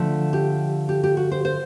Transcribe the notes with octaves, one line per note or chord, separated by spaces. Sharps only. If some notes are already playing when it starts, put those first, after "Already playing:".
Already playing: D3 F3 A3
G4
G4
G4
F#4
C5
C5